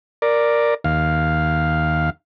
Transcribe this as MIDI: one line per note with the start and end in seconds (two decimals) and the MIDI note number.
0.22 0.74 70
0.22 0.74 74
0.84 2.10 39
0.84 2.10 77